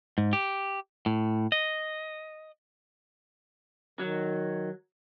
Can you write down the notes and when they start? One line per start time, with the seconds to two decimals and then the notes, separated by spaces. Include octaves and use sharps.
0.18 G#2
0.33 G4
1.06 A2
1.52 D#5
3.99 D#3 F#3